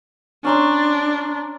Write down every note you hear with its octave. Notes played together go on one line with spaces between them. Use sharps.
C#4 D4 A#5 C6